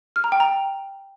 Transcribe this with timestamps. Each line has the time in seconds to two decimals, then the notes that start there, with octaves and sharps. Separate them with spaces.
0.16 F6
0.24 A#5
0.32 G5
0.40 A#5